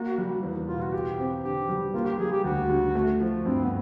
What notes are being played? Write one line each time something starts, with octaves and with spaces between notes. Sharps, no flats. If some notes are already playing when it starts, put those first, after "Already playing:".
Already playing: A#3 F#4
G3
E2
B2 F4
F#4
F4 G4
C4
D3 G4
G3
A#3 F4
G4
G3 G#4
G4
D2 F#4
D3
A3
F3
G2 C4
B3